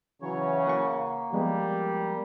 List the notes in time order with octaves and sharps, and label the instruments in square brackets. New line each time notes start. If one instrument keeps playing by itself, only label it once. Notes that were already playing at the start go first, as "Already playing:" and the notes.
[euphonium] C#3 [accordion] E3 F#3 C#5
[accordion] A#3 [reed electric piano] F#5 C#6
[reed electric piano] F3 G#3 B3 [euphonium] G3